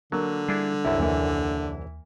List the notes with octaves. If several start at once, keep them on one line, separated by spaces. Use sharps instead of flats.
D3 F#3 A#3
G3 D4 E4 G#4
C2 F#2 E4
D#2 E3 A#3 E4